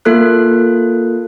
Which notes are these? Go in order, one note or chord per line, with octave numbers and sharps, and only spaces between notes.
A#3 F4 A4 F#6